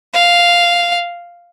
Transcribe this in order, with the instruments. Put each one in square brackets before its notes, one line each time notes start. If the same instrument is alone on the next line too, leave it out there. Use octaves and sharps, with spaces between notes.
[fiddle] F5